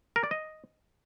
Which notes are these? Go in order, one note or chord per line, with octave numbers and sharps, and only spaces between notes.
A#4
D5
D#5